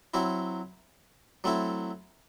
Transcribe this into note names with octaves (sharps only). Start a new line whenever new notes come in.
F#3 C4 E4
F#3 A3 C4 E4